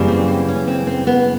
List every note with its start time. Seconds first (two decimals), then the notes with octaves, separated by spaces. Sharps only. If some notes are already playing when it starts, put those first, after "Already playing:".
Already playing: F#2 C#3 E3 G3 A#3
0.08 C4
0.28 C4
0.49 C#4
0.68 C4
0.87 C4
1.07 B3